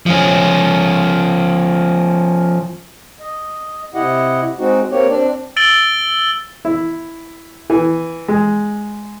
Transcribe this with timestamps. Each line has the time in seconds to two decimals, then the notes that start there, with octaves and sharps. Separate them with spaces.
0.06 F3 C#4
3.20 D#5
3.94 C3 E4 G4 D#5 F#5
4.59 G#3 C4 D#4 F#4
4.91 A#3 C4 G4 C#5
5.10 C4 D4 D5
5.56 E6 A6 D7 F#7 G7
6.65 E4
7.70 E3
8.28 G#3